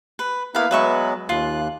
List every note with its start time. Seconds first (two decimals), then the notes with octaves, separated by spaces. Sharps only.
0.19 B4
0.55 A#3 B3 E4 B4 F5
0.71 F#3 G#3 B3 B4 E5 C#6
1.29 D#2 F4 F#6